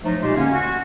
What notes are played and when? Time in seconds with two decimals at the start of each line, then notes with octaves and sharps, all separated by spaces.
0.04 F3 F#3 A3 D#4
0.21 A#2 G#3 A3 G4 C6
0.36 D3 A#3 C#4
0.52 F#4